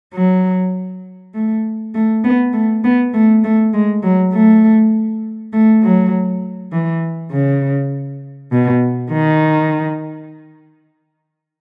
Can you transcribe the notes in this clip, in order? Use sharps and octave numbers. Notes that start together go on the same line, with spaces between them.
F#3
A3
A3
B3
A3
B3
A3
A3
G#3
F#3
A3
A3
F#3
E3
C#3
B2
D#3